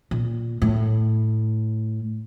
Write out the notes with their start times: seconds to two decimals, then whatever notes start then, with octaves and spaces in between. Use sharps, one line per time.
0.11 A#2
0.62 A2